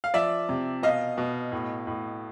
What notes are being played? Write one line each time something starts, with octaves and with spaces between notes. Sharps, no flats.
F5
F3 D5 E5
C3
B2 D#5 F5
B2
A2
A2